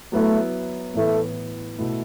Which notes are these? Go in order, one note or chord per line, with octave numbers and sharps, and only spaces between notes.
F#3 A3 B3 E4
A2 E3 A3 B3
B2 A3 E4